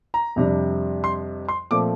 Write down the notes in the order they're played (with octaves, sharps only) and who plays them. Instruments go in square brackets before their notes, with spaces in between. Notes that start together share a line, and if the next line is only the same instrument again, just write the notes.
[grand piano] A#5
F2 C3 G3 D4
C6
C6
A#2 F3 A3 C4 D6